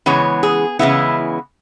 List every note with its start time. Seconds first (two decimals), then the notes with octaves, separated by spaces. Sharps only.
0.06 C#3 E3 G#3 B3 C#5
0.43 G#4
0.79 C#3 E3 G#3 B3 E4